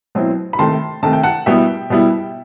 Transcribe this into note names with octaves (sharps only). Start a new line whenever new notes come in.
B2 F#3 C4 E4
B5
C3 D#3 A3 A5 C6
C3 D#3 A3 A5
G5
F#5 A5
B2 G3 B3 E4 E5 G5
B2 G3 B3 E4